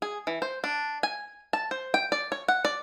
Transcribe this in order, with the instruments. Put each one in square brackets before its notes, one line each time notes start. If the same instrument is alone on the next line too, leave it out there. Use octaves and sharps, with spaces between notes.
[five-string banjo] G#4
E3
C5
D4
G#5
A5
C5
G5
D5
C#5
F#5
D5